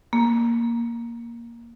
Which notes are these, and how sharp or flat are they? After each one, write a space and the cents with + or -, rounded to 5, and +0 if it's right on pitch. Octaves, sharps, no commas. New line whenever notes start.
A#3 +5